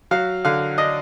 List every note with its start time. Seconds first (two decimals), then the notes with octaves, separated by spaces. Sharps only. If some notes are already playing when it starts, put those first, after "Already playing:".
0.11 F#3 F5
0.45 D3 F5
0.78 D4 D#5